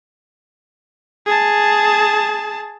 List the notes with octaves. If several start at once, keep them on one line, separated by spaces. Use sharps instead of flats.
G#4 A5